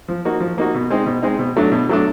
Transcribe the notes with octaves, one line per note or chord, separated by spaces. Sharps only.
F3
A#3 D#4 F#4
F3
A#3 D#4 F#4
B2
G#3 C4 D#4
B2
G#3 C4 D#4
B2
F#3 A3 D4
B2
F#3 A3 D4